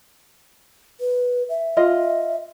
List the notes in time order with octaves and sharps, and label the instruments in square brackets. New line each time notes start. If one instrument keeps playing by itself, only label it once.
[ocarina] B4
E5
[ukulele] F4 D#5